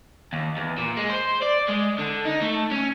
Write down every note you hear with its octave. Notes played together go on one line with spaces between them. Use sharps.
D#2
E2
A#2
G#3
C5
D5
G#3
D3
D#4
A3
C#4